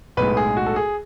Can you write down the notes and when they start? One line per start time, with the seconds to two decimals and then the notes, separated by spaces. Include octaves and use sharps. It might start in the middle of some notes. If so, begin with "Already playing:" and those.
0.17 B1 A2 G#3 B4
0.37 G#4
0.57 F#4
0.66 A4
0.76 G#4